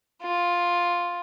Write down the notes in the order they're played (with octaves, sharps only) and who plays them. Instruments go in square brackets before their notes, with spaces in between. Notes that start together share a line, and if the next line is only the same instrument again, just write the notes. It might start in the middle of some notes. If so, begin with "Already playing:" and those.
[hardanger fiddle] F4